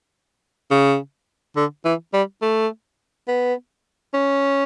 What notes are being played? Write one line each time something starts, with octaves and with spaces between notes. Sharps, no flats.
C#3
D3
E3
G3
A3
B3
C#4